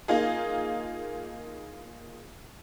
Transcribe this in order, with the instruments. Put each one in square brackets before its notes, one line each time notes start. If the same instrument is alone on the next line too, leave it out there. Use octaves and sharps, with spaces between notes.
[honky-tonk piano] A#3 D#4 F4 G#4